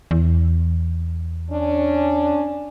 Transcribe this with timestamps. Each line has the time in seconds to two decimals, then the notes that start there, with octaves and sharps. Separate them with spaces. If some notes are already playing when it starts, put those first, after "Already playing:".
0.11 E2
1.51 C#4 D4